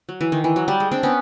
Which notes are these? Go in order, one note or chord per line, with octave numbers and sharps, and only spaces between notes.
F#3
E3
D#3
E3
F#3
G3
G#3
C4 D4
B3 C#4